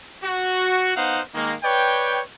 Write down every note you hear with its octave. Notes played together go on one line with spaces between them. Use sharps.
F#4
B3 D#4 C5 F5 F#5
D#3 G#3 A#3
B4 C#5 D5 G5